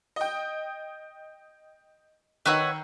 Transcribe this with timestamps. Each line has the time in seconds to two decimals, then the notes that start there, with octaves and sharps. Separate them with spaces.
0.16 D#5 G5
2.46 D#3 D#4 B4 C#5 F#5 E6